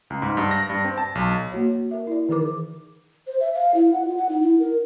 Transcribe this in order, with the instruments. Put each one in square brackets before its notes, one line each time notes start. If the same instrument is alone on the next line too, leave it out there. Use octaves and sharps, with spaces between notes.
[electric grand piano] C#2
G#2
G2
A#6
G2
C4
A5
B1
[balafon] A#3 F#4 C#5
A#4 E5
E4 D5
D#3 E3 D#4 G#4 A#4 D6
[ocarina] C5
E5
F5
E4
F#5
F4
F#5
D#4
E4
A#4